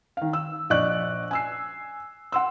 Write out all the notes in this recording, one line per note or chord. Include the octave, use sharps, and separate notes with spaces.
D#3 F5
E6
A#1 D5 D#5 C#6 F#6
G#5 E6 C7
F#5 C6 E6